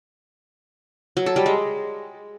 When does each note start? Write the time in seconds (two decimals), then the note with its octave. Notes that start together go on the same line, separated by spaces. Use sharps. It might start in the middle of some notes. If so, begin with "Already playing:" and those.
1.17 F#3
1.26 A4
1.36 G3
1.46 G#3